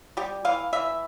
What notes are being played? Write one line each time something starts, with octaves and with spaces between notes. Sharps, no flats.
G3 G4
E3 F5
E3 E5